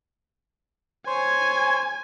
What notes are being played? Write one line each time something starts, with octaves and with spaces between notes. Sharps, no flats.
C5 C#5 G#5